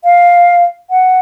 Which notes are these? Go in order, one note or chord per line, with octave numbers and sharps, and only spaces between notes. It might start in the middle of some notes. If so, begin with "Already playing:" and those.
F5
F#5